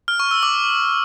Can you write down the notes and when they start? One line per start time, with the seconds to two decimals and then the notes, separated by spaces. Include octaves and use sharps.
0.08 F6
0.20 C#6
0.31 E6
0.43 D6